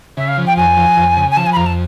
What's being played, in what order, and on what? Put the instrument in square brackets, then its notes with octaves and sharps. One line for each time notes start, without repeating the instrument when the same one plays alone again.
[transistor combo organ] C#3 [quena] E5
[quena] F5
[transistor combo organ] F3
[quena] G5
[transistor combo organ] F2 [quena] G#5
[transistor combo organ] F3
F2
C#3
[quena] G#5
[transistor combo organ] F3 [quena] A5
[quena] G#5
B5
[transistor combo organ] F2 [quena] A#5
[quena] A5